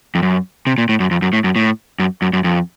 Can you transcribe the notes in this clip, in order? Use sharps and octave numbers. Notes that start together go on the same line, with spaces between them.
F2
F#2
C3
A#2
A2
F#2
F2
F#2
A2
F#2
A2
F#2
F#2
F#2
F2